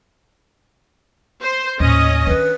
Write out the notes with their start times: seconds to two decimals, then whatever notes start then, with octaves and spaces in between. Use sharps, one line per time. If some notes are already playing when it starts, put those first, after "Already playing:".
1.43 C5
1.80 D#2 A2 C#4 D#5
2.27 D#3 D4 B4